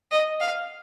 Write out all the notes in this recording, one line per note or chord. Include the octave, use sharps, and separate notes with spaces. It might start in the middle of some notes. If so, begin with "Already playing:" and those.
D#5
F5